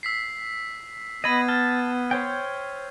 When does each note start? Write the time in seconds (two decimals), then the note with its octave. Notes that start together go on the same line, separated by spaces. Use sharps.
0.03 E6 B6 C7
1.24 B3 D#5 B5 G#6 A6 D#7
1.48 A5 F6
2.11 C5 C#5 G5